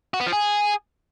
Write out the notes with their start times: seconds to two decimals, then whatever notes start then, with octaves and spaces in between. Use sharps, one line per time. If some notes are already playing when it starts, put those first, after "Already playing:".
0.14 F#4
0.20 B3
0.26 F3
0.33 G#4